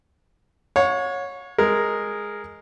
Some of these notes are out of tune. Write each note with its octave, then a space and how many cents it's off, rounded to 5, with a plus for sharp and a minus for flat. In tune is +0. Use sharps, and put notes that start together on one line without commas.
C#5 +0 F#5 -45
G#3 +0 A#4 +0